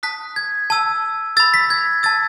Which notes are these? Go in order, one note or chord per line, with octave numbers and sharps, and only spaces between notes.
A5 D#6 F#6 B6
G#6
A5 E6
B5 E6 A6
B6
G#6
A5 E6 A6